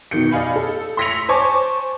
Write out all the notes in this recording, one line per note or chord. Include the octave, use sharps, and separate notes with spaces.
B2 D#3 G6 C#7
D5 D#5 F5 G#5 B5
A4
C6 E6 A#6 B6 C#7 F7
C5 C#5 G#5 A5 C#6 D6